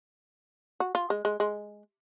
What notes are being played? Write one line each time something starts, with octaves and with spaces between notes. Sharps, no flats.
F#4
F4
G#3
G#3
G#3